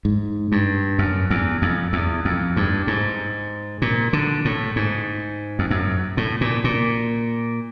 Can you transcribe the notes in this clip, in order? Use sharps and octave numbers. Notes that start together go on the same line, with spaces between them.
G#2
G2
F#2
E2
F2
E2
F2
G2
G#2
A#2
D3
A2
G#2
F2
F#2
A2
A#2
A#2